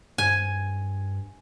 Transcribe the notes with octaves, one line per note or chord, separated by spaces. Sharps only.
G2 G#5